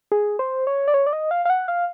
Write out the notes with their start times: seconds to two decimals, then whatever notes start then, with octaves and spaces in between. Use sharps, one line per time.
0.12 G#4
0.39 C5
0.67 C#5
0.88 D5
0.94 C#5
1.07 D5
1.13 D#5
1.31 F5
1.45 F5
1.50 F#5
1.68 F5